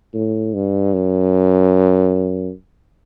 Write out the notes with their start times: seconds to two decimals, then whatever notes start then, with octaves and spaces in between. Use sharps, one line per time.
0.14 A2
0.54 G2
0.94 F#2